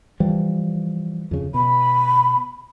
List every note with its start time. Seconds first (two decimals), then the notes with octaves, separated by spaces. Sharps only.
0.20 E3 F3 G3
1.31 F2 C#3
1.54 B2 B5